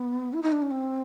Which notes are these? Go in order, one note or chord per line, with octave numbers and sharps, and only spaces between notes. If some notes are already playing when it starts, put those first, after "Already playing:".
Already playing: B3
E4
D#4
D4
C#4
C4